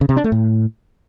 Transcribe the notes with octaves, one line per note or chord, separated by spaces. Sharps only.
C#3
C3
D4
A3
A2